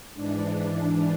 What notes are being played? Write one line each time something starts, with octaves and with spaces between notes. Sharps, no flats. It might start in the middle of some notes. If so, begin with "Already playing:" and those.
G#2 E3 D4